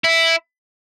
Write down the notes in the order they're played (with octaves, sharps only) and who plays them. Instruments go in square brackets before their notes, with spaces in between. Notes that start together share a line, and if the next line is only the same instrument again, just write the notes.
[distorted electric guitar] E4